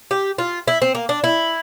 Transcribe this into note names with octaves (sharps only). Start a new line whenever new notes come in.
G4
F4
E4
C4
A#3
D4
E4